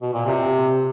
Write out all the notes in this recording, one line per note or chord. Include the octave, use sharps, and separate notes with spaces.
B2
A#2
C3